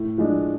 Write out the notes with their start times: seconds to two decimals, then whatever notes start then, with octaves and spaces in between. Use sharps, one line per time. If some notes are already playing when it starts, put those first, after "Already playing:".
Already playing: A2
0.18 F3 G#3 D4